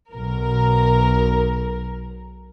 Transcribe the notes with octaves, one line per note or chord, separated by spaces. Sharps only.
B1 A#4